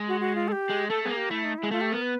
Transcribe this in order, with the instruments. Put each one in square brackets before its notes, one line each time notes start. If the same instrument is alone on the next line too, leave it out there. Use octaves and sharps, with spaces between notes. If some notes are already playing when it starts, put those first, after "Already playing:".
Already playing: [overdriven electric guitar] G#3
[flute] F#4
F#4
F4
A4
G4
[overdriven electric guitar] G#3
[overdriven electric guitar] A3 [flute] A4
[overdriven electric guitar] B3 [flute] G#4
[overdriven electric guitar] A#3
[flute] G4
[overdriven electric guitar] A3 [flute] E4
[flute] D#4
E4
[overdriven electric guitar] G#3
[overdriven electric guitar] A3 [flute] F4
[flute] G4
[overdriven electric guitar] B3 [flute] A#4
[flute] B4